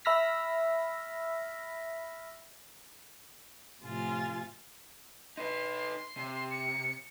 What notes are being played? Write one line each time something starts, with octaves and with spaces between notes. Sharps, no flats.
E5 B5 E6 F6 A#6 B6
A2 C3 F3 F4 G#5 A6
D#4 B4 C6
C3
C#7